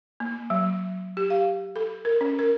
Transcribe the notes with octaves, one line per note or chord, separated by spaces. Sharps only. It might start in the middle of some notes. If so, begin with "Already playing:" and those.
A#3
F#3
G4
F5
A4
A#4
C#4
A#4